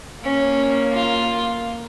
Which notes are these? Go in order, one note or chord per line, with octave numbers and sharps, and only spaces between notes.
A#3 C#4
F4